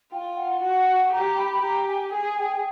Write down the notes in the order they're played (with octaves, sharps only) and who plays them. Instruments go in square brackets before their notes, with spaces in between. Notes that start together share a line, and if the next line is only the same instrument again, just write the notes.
[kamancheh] F4 [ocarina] G5
[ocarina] F#5
[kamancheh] F#4 [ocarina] F#5
[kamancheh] G4 [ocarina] A#5
[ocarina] B5
B5
[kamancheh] G4 [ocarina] A#5
[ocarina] G#5
[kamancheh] G#4 [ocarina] G#5
[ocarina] G5